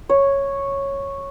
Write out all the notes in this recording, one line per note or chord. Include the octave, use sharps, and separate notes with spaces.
C#5